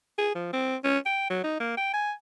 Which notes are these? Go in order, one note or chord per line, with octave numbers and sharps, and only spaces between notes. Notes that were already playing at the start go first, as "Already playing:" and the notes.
G#4
F3
C4
C#4
G5
F#3
D#4
A#3
G5
G#5